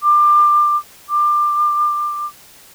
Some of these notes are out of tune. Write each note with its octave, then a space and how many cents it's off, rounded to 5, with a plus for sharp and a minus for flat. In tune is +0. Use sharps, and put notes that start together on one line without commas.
D6 +25
D6 +20